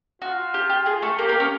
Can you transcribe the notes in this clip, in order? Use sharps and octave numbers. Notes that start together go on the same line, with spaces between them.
F4 F#4
G4
G4
G#4
A3 A4
A#3 G4 A#4
A#3 A#4
C#4 C#5